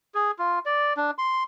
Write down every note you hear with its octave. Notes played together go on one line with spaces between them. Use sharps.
G#4
F4
D5
D4
C6